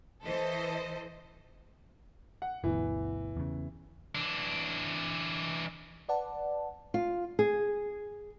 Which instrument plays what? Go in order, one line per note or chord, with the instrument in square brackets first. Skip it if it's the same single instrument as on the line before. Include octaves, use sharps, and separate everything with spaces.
[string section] E3 A4 C5 D#5
[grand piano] F#5
[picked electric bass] G1 D2 B2 [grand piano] E3
[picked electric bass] E2 C#3
[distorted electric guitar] E3 D4
[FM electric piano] B4 D5 F#5 A5
[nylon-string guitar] F4
G#4